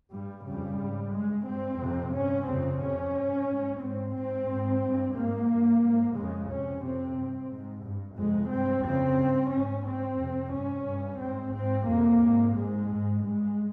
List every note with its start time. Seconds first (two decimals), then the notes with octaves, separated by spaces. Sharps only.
0.11 G2 G3
0.44 F2 C#3 G3
0.77 G#2
1.12 G2 G#3
1.45 G2 C4
1.78 F2 C3
2.13 G2 C#4
2.46 F2 C#3 C4
2.79 F2 C3 C#4
3.14 G2
3.46 G#2
3.80 G#2 C4
4.14 G#2 C4
4.48 G#2
4.82 G2
5.16 G#2 A#3
5.49 G2
5.83 G#2
6.16 F2 C#3 G#3
6.50 F2 C3 C#4
6.83 F2 C3 C4
7.17 G2
7.51 G#2
7.84 G2
8.18 F2 C3 G#3
8.51 G2 C4
8.85 F2 C#3 C4
9.19 G2
9.52 G#2 C#4
9.85 G#2 C4
10.19 F2 C3
10.53 G2 C#4
10.86 G2
11.20 G#2 C4
11.54 G#2 C4
11.87 F2 C3 A#3
12.21 G#2
12.54 G#2 G#3
12.89 G#2
13.22 G2 G#3